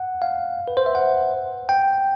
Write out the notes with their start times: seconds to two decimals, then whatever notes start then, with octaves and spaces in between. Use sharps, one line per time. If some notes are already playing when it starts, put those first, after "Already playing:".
Already playing: F#5
0.22 F5
0.68 B4
0.77 C5
0.86 E5
0.95 F#5
1.69 G5